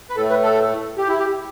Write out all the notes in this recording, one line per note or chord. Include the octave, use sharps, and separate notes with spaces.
B4
A2 A4
A3
B4
A4
G4
E4
G4